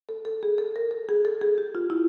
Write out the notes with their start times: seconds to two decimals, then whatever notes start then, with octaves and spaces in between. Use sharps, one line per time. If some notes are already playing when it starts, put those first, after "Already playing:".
0.09 A4
0.25 A4
0.43 G#4
0.58 A4
0.76 A#4
0.91 A4
1.09 G#4
1.25 A4
1.41 G#4
1.58 G4
1.75 F4
1.90 E4